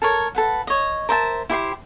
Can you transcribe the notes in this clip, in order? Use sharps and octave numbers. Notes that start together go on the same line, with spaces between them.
A4 A#4 C#5
A4 B4 F#5
C#5 D#5
A#4 C5 E5 A5
E4 G4 C5 C6